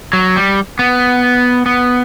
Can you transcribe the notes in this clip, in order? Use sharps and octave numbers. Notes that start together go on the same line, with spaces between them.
F#3
G3
B3
B3